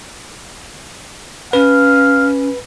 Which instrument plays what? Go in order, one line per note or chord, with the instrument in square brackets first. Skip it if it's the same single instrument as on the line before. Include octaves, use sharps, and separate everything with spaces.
[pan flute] C#4 [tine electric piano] B4 [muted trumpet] F5